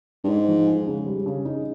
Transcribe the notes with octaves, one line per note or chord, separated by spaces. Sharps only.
G2
G#2 G#3
F3
G#3
C#3
G3
C#3
D#4